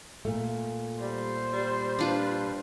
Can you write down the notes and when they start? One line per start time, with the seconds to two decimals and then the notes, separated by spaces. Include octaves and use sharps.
0.25 A#2 A3
1.01 G3 C5
1.53 G3
1.99 D4 F4 B4